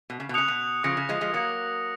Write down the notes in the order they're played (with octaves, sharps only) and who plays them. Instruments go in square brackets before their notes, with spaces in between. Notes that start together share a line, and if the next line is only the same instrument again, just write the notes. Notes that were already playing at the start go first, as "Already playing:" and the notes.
[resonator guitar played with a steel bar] B2
C#3
B2
[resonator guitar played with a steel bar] C#3 [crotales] D#6 F#6 C#7 F7
[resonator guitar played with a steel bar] B2
[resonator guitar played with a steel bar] C#3 F3 [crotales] D#6 A#6 C#7
[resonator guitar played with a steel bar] C#3
F3 G#3
F3 G#3
[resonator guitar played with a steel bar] F#3 A#3 [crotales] D#6 A#6 C#7